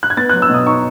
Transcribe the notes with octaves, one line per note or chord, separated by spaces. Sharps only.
F#6
G#6
B3 A6
F#6
F#3
E6
B2 D#6
D#4 C#6